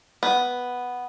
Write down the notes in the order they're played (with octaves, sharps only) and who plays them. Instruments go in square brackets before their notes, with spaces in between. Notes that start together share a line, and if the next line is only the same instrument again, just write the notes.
[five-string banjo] B3